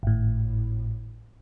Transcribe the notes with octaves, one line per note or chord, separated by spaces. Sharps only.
G#1 A2